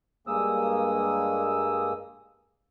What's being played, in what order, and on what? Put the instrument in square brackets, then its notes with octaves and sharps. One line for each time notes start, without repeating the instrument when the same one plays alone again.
[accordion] G2 G#3 A#3 D#6 E6